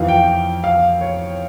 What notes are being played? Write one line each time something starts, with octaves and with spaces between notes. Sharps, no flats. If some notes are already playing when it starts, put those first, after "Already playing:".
Already playing: F2 E3 F5
G5
F5
C#5